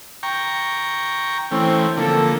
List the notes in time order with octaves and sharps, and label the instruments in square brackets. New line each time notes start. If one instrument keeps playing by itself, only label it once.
[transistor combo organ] G5 A#5 C#6
[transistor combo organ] E3 A3 C#4 [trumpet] C4
[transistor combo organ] D3 F3 A#3 [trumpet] A4